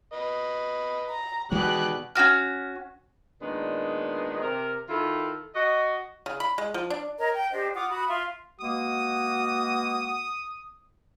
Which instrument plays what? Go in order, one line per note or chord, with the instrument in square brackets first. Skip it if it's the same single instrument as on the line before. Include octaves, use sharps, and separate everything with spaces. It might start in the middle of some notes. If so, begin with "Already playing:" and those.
[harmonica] B4 D#5
[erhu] A#5
[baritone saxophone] B2 [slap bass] D#3 E3 G#3 [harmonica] G4 G#4 D5 [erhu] F#6
[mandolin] C#4 F4 F#4 F6
[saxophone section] A#2 D#3 G#3 B3 D4
C3 A#4
D#3 E4 F4 A4
F#4 D#5
[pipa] C#3
B5
G#3
F3
D4
[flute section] A#4 C#5 D#5 A#5
G5
D4 G4 C5 D#5
F4 F#5 D6 D#6
F#4 B5 D#6
F4 E5 F5 C6
[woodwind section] B2 G#3 A#3 [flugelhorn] F#4 [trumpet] D#6